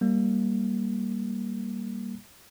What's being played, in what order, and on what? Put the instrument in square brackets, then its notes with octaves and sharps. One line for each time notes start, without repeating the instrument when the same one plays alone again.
[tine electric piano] G3 A#3